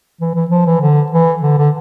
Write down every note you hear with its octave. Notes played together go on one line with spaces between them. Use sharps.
E3
E3
F3
E3
D3
E3
D3
D3